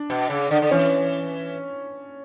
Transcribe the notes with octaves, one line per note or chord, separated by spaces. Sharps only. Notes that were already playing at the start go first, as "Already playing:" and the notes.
Already playing: D4
B2
C#3
D3
D3
E3 C#4